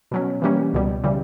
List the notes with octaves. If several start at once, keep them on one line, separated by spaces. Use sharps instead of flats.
B2 F#3 C#4
E3 G3 A#3 C#4
C#2 B2 G3
C#3 E3 G3